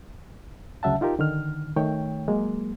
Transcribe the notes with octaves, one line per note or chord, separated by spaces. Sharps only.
D2 C#3 F#3 E5 F#5 A5
D#4 F4 G4 A#4
D3 D#3 F6
D#3 A3 C#5 G5
F#3 G#3 A#3